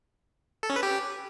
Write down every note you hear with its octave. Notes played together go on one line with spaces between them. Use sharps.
A4
C#4
B4
G4